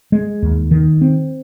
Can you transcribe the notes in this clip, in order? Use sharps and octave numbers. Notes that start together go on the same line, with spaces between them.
G#3
D#2
D#3
C4